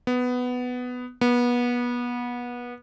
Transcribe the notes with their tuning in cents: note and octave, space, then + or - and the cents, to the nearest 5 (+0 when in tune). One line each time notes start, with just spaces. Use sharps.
B3 +10
B3 -25